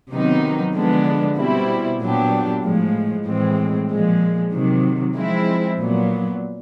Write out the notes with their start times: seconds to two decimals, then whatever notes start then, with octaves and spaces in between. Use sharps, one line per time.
0.11 C3 D#3 F#3 B3 D#4
0.73 D3 F3 G#3 B3 D4
1.37 B2 G3 C4 E4
2.00 A#2 F#3 B3 D4 G4
2.63 A2 F3 G#3
3.26 A2 E3 G#3 C4
3.89 A#2 F3 G#3
4.52 C3 D#3 F#3
5.15 F3 G#3 C4 E4
5.79 A#2 F#3 B3